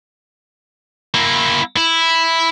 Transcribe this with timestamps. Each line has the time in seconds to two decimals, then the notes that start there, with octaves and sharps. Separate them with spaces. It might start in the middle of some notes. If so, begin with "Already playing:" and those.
1.14 A#3 E4
1.77 E4